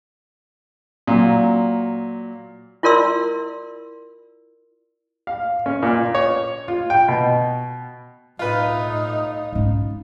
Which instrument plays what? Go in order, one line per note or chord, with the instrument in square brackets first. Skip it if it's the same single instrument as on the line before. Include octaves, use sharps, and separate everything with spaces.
[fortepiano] A#2 F#3
[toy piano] E4 F4 A#4 D5 C6 E6
[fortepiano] F5
C#4
A#2
C#5
F4
G5
B2
[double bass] A2 D#4 [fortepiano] F4 B4
[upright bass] G#2 C#4